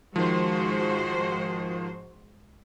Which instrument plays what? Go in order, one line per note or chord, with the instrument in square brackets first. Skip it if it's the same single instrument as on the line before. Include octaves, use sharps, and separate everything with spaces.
[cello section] G#2 F#4 C5 [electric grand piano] D#3 F3